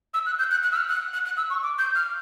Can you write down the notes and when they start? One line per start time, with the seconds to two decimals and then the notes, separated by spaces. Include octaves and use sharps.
0.14 E6
0.26 F#6
0.39 G6
0.51 F#6
0.63 F#6
0.72 E6
0.76 F6
0.88 F#6
1.13 F#6
1.25 F#6
1.37 E6
1.50 C#6
1.63 D6
1.79 G6
1.95 F6